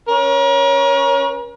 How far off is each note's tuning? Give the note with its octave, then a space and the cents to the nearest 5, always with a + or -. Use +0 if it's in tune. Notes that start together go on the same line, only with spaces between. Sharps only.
C#4 +0 A#4 +40